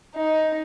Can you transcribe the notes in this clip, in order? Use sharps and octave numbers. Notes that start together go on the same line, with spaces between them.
D#4